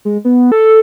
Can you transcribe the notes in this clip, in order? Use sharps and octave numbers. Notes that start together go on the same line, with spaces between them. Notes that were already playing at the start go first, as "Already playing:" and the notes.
G#3
B3
A4